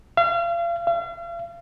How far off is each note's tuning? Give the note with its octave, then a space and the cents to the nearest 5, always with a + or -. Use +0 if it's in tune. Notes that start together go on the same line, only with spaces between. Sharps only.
F5 -35
F5 -40